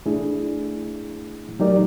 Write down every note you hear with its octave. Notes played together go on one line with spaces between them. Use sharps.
A3 D4 E4 G#4
F#3 A3 D#4 G4 A#4 D5